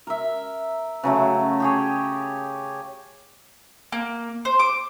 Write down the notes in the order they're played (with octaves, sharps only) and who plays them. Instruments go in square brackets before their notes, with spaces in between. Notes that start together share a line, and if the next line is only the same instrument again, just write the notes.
[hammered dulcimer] A#4 E5
C#3 F#3 A3
G4 G#4 C#5
[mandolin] A#3
C5
D6